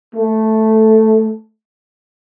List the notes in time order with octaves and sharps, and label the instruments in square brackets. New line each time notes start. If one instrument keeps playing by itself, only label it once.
[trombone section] A3